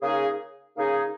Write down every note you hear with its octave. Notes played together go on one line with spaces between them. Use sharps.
C#3 A#3 D#4 G#4
C#3 A#3 D#4 G#4